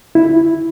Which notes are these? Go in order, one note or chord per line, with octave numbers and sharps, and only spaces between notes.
E4